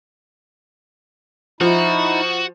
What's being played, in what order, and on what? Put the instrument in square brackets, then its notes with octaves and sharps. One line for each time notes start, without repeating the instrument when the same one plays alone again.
[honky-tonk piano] F3 [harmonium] D#4 E4 [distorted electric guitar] F#4